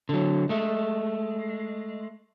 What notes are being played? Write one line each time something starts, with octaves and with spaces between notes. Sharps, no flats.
D3 F#3
G#3 A3